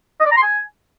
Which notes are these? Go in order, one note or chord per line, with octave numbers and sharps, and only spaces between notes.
D#5
D5
A#5
C6
G#5